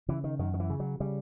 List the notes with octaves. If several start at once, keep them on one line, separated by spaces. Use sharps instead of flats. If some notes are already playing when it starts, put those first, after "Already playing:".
C#3 E3
D#3
F#2 D#3
D#3
E3
C#3
F#3
C#3 G3